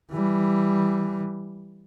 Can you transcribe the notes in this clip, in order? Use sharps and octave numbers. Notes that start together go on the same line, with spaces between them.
E3 G3